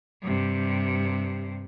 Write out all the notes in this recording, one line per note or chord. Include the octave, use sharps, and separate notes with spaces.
G2 C3